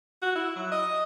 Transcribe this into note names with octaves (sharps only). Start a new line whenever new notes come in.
F#4
E4
F#3
D#5